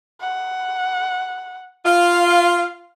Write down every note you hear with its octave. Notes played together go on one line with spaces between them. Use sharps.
F#5
F4 F5